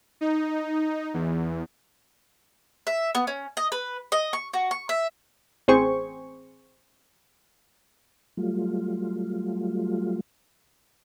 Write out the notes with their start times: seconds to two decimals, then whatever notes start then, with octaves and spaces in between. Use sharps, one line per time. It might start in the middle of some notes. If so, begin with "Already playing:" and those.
0.21 D#4
1.14 E2
2.87 E5
3.15 B3
3.27 C#4
3.57 D#5
3.72 B4
4.12 D#5
4.33 C#6
4.53 F#4
4.71 C#6
4.89 E5
5.68 A1 C4 G#4 C5 C#6
8.37 F#3 G3 A3 F4